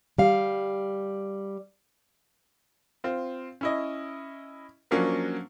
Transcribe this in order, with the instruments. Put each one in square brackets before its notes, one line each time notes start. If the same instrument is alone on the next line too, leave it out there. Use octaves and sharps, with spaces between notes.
[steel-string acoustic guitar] G3 F5
[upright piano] C4 F4
C#4 E4 D#5
F3 F#3 A#3 C#4 D4